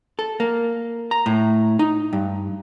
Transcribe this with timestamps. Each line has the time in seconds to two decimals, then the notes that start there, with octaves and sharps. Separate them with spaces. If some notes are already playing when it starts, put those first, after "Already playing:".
0.19 A4
0.40 A#3
1.11 A#5
1.26 A2
1.79 D#4
2.13 G2